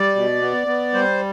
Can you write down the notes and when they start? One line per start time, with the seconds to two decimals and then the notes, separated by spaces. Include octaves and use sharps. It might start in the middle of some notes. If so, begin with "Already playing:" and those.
Already playing: G3 D5
0.15 B2
0.42 B3
0.67 B3
0.94 G3 C5